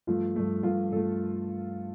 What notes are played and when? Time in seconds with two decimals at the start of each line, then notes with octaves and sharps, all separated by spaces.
0.07 G2 F3 A3 F4
0.36 G2 F3 A3
0.63 G2 F3 A3 F4
0.92 G2 F3 A3 A4